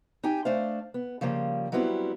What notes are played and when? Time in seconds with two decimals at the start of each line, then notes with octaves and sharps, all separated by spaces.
0.23 D#4 G4 G5 G#5
0.45 A3 D4 C5 D5 F5
0.94 B3
1.21 C#3 F3 G3 A#3
1.72 F#3 G3 B3 C4 E4